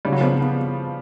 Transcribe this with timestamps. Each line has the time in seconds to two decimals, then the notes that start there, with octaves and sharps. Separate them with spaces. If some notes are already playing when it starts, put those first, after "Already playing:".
0.05 C#3 G3
0.12 F#3
0.21 F3 G3 B3
0.41 B3